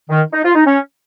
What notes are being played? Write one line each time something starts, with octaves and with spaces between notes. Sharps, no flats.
D#3
D#4
F4
D#4
C#4